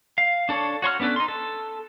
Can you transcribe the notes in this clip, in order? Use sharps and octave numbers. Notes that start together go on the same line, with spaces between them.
F5
D4 A4 C#5
F#4 C#5 C6 F6
B3 C#4 D4 A4 B4
D#4 C6
A4